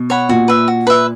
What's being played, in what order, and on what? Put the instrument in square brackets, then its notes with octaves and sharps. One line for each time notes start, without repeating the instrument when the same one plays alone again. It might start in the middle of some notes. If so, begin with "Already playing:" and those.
Already playing: [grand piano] B2
[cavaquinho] C#5 F#5 B5
[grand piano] A#2 [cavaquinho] F#4
[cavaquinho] B4 E5
F#4
B4 E5